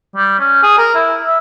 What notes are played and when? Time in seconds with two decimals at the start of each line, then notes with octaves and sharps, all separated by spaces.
0.16 G3
0.39 C#4
0.63 G#4
0.78 A#4
0.95 E4
1.26 E5